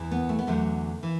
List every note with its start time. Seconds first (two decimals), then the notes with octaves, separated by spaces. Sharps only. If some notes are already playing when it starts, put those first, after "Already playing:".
Already playing: E2 E3
0.11 B3
0.29 A3
0.39 B3
0.47 E2 D3 F#3 A3
1.03 E3